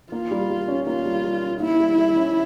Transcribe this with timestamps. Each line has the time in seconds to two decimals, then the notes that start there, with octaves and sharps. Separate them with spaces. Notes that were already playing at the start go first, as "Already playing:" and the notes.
0.12 A#3 F4
0.31 G3
0.50 G3
0.68 C#4
0.87 A#3 F4
1.05 G3
1.24 G3
1.43 C#4
1.60 A#3 E4
1.80 G3
1.98 G3
2.16 C#4